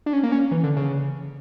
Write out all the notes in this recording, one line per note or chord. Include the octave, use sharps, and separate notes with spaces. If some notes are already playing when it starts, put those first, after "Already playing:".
D4
C#4
A#3
C#4
E3
D3
C#3